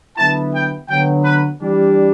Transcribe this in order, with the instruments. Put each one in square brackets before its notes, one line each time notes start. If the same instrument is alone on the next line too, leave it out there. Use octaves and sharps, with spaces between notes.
[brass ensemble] D3 F#3 B3 E4 A5
G5
D3 F#3 B3 G5
B4
E3 G3 D4